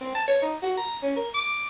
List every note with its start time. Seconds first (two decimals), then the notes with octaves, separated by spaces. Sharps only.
0.01 C4
0.15 A5
0.28 C#5
0.42 D#4
0.63 F#4
0.77 A#5
1.02 C#4
1.16 A#4
1.34 D6